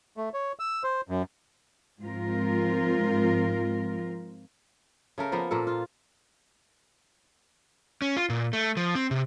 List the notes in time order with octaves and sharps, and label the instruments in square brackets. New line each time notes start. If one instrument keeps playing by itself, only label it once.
[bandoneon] A3
C#5
E6
C5
F#2
[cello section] G#2 F3 C4 F4 A#4
[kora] C#3 A3 A#4
F3 A#3 B3
A#2 A#3 A4
F4
[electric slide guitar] C#4
F4
A#2
A3
F3
C4
C3